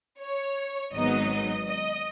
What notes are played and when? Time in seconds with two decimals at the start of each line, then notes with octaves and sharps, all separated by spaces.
0.20 C#5
0.94 G#1 G#2 F#3 B3 D#4 D#5
1.68 D#5